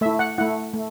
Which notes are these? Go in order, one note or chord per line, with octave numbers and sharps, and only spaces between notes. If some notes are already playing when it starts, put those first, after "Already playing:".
A3 E4 E5
F#5
A3 E4 F#5
A3